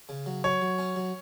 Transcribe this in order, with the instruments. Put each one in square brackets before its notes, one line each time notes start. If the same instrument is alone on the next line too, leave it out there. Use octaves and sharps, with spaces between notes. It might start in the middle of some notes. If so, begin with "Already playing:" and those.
[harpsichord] C#3
F#3
[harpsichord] F#3 [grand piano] C#5
[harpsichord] F#3
C#4
F#3